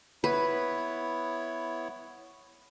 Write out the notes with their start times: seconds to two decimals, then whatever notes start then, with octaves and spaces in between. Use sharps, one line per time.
0.24 B3 E4 B4 C#5